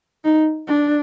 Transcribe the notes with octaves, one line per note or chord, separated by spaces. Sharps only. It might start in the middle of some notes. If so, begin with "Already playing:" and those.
D#4
D4